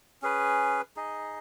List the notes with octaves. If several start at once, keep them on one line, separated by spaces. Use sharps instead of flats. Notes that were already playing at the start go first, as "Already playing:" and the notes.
C#4 G#4 B4
D#4 G#4 D#5